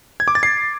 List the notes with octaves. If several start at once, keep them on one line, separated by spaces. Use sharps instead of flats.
G#6
D6
A6
C7